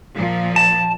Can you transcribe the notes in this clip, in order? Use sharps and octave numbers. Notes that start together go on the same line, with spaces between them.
A#2 F3
A5